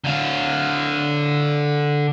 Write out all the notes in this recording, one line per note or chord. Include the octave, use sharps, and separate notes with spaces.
D3 F5